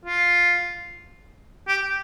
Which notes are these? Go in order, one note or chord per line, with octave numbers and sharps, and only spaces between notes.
F4
G4